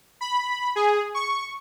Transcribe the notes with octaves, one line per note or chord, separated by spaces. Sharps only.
B5
G#4
C#6